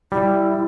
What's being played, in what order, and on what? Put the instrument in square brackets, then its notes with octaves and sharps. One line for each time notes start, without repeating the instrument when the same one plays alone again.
[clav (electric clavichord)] G3 [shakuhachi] E4